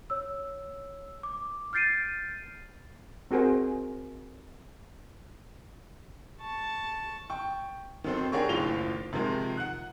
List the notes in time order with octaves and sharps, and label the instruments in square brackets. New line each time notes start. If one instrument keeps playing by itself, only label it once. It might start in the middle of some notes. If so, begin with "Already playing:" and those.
[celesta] C#5 E6
D6
F6 G6 A6 C7 D7 D#7
[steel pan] C4 F#4 G#4 A#4 C5
[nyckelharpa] A5 C#6
[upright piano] G5 C#6
D#3 F#3 C4 A4 C5
D4 G4 G#4 A#4 C#5 C#6
F#1 D#2 A2 F4 F7 G7
C3 D#3 F3 G#3 A#4
F#5 F#6